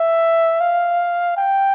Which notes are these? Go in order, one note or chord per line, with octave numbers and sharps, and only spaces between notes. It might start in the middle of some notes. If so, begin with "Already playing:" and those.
Already playing: E5
F5
G5